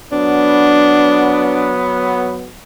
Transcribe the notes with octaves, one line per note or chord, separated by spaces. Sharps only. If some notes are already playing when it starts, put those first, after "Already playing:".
F#3 B3 D4